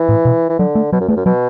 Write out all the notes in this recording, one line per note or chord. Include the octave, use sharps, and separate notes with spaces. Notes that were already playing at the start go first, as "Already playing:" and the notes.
Already playing: E3
A2
B2
E3
D3 F#3
A3
B2 F#3
F#2
E2 A3
F#2
B2 F#3